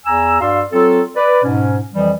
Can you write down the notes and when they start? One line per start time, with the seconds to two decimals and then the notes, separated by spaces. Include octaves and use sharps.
0.05 E2 G#5 A#5 E6
0.40 G2 F#4 D5 F5 C6 E6
0.73 F#3 C4 F4 A4
1.16 B4 D5
1.43 G#2 B2 C#4
1.93 F2 E3 F3 G3